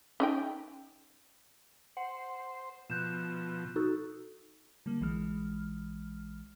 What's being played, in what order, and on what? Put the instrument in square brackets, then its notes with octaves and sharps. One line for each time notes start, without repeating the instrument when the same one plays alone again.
[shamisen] C#4 D#4 G5
[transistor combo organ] C5 [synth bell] F#5
[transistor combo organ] B2 F3 [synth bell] F#6 G6 E7
[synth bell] D#4 F#4 A4
[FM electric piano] D3 G3 A#3
A#1 E3 G#3 F6